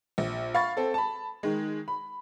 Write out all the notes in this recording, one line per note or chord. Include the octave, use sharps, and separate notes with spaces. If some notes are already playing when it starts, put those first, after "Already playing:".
A#1
F5 B5 C#6 A6
C4 A4
A5 B5
D#3 G#3
B5